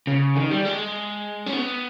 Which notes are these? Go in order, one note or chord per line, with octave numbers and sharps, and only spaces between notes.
C#3
D#3
G3
G#3
C#4
B3